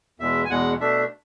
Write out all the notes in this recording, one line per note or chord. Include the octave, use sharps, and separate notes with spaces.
E2 B2 G#3 E5
G#5
E2 B2 G#3 F#5
B2 A3 D4 E5